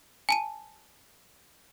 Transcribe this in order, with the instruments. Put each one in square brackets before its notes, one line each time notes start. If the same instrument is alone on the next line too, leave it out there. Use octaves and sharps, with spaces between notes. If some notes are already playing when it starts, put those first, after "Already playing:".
[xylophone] G#5 A5 D#7